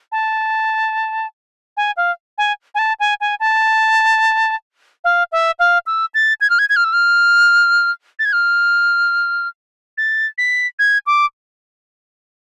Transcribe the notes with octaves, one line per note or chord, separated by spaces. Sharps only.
A5
G#5
F5
G#5
G#5
A5
G#5
G#5
A5
F5
E5
F5
E6
A6
G#6
F6
G#6
G#6
F6
E6
F6
A6
G#6
F6
A6
B6
G#6
D6